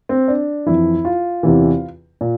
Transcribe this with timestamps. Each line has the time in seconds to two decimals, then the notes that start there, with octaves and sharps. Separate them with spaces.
0.09 C4
0.28 D4
0.66 F2 E3 E4
1.05 F4
1.43 E2 C3 E3
2.21 A#2